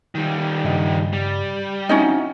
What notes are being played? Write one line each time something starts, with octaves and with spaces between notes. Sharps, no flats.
D#3 G3
G2 C#3 D#5
G3
C4 C#4 D#4 E4 F#4 D#5